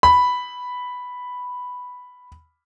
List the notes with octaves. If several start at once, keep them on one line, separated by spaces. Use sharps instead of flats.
B5